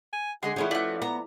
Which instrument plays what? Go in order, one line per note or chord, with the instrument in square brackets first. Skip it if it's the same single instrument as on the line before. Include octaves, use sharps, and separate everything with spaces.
[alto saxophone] G#5
[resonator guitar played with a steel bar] D3 G#3 G#4 [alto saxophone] F#5 [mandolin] C6
[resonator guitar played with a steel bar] E3 A3 G#4 [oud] F3 C#4 E4
[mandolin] A3 F#4 [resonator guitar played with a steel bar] B4 D5
[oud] B3 [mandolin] A#5